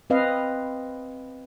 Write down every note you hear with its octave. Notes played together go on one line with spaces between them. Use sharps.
C4 B4 D#5 F5